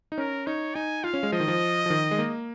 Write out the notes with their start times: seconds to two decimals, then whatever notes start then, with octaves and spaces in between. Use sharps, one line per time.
0.12 D#4
0.18 C#4 A#4
0.47 D#4 C#5
0.75 D#4 G#5
1.04 F4 F5
1.14 C#4
1.23 G#3
1.32 F3 D#5
1.40 D#3
1.48 F3
1.86 F3
1.90 D#3
2.11 G#3
2.19 A#3